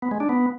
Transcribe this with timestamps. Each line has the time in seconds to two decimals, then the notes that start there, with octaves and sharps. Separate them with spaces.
0.02 B3
0.11 G#3
0.20 D4
0.29 B3